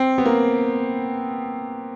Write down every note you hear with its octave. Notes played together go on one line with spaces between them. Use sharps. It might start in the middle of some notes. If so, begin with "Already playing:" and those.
Already playing: C4
B3
A#3